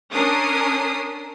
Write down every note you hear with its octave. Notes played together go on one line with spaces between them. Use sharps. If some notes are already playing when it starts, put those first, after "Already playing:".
C#4 D4 A#4 D#6 C7